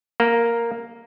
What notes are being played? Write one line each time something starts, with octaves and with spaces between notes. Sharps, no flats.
A#3